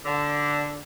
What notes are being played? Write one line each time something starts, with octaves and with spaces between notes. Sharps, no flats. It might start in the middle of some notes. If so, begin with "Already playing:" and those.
D3